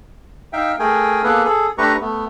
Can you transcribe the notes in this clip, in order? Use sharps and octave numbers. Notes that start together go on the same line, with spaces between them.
D#4 E5 F5 G5
A3 G#4 A#4 G5 G#5
A#3 B3 G#4 A4 B4
G#4 A4
A3 D4 G4 B4 A#5 C#6
A3 B3